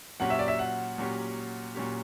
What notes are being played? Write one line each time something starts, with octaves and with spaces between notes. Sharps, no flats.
A#2 F#3 C#4 G4 F#5
E5
D5
E5
F#5
A#2 F#3 C#4 G4
A#2 F#3 C#4 G4